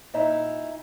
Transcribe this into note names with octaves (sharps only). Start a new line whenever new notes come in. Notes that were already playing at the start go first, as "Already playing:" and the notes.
A#2 D#4 E4 E5 A#5